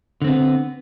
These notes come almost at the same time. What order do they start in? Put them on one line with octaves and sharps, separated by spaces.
D3 C4 B3